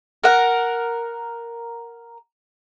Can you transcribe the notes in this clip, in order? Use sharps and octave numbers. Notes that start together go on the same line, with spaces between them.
A#4 F#5